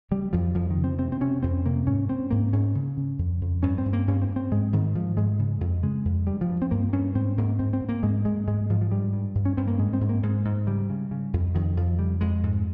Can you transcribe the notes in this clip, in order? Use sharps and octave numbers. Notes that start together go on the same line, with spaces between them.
C#3 G3
F2 F3
F2 F3
D#3
C#3
C4
C3 C4
C4
C3 C#4
F2 C4
C3 A#3
G#2 C#4
G#2 C4
G#2 A#3
G#2 C#4
C#3
C#3
F2
F2
G2 C#4
C4
G2
A#3
G2 C#4
C4
G2
C4
G#2 G#3
G#2 D#3
G#2 F3
G#2 G#3
C#3
F2
C#3 G#3
F2
G2 G3
F3
G2
C4
G2 A#3
G2 C#4
G#2 C4
G#2 A#3
G#2 C4
C4
G#2
A#3
G#2 G#3
G#2 G#3
G#2 G#3
G#2 F3
F3
G2 G3
G2
G2
C#4
G2 C4
A#3
G#2 G#3
C4
G#2
A#3
G#2 G#3
G#2
C#3 G3
C#3
C#3
F2
F2 D#3
F2 F3
C#3 G3
F2 G#3
G#2